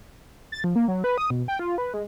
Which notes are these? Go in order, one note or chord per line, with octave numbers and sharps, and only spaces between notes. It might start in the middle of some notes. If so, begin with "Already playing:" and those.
A6
F3
A#3
F#3
B4
D#6
B2
G5
F4
B4
G#3